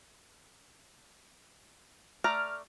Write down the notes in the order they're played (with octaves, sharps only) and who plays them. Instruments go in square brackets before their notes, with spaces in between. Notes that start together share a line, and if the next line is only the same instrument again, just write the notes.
[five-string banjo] A3 D5 A#5 [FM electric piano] F6